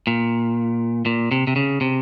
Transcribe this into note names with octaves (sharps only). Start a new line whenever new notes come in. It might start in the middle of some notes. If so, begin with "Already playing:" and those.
A#2
A#2
C3
C3
C#3
C3